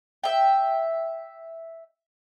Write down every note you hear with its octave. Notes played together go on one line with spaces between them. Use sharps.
E5 G5